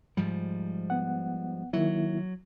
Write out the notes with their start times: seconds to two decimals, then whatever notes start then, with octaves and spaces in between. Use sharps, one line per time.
0.17 G#2 F3 G3
0.90 B3 F#5
1.73 D#3 F#3 A#3 E4